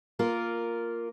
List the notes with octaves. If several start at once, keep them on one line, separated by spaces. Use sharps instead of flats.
A#3 F4 A#4